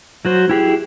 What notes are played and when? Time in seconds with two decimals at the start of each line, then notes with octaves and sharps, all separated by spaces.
0.25 F#3 F#4 C5
0.49 E4 G4 G#4